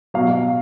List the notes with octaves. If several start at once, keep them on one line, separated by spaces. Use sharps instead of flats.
B2 F#3 F5